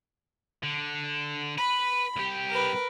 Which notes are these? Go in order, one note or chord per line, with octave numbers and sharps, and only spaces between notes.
D3
B4 B5
C2 G4
A#4 B4